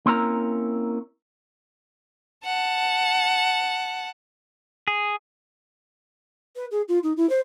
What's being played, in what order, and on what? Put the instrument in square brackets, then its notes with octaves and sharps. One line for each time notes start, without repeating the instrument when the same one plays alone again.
[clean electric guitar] A#3 C4 C#4 E4 A#4 A#5
[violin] F#5 A5
[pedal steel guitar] G#4
[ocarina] B4
G#4
F4
D#4
E4
C5